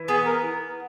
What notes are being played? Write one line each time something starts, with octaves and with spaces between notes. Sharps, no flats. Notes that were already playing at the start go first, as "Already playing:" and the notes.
Already playing: E3
B3 G#4
A#4